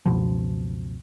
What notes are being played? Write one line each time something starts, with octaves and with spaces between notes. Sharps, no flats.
C#2 F#2 B2 F3